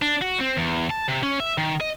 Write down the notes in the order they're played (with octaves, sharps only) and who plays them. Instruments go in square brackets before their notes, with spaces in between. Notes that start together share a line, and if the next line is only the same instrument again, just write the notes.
[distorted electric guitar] D4
F#4
C4
E2
A5
C3
C#4
E5
D#3
D#5